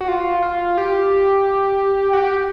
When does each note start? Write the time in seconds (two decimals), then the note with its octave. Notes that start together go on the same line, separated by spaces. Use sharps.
0.01 F#4
0.08 F4
0.42 F4
0.78 G4
2.13 F#4
2.17 G4